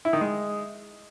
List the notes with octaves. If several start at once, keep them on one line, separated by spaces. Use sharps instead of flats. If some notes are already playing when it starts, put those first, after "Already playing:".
E4
D#3
G#3